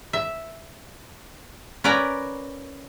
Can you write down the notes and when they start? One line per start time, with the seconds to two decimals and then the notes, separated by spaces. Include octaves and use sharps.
0.13 E5
1.84 C#4 A#4 B4 D5 A#5